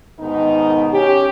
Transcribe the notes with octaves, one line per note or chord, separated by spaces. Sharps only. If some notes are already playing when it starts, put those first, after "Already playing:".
G#2 B2 D#3 D#4
C#4 G4